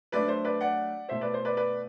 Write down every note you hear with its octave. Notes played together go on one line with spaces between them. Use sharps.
F#3 A3 D4 B4 D5
C5
B4 D5
D5 F#5
B2 A3 E4 C5 E5
B4 D5
C5
B4 D5
B4 D5